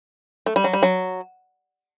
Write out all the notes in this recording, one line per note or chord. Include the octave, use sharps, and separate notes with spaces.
A3
G3
F#3
G3
F#3